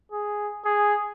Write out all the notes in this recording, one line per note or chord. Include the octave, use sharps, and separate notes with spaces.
G#4
G#4